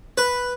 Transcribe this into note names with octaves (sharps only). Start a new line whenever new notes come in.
B4